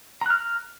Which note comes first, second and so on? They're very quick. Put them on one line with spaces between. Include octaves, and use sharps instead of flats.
A#5 F#6 F6